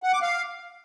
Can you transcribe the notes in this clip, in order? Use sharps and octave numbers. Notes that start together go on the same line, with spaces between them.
F#5
D6
F5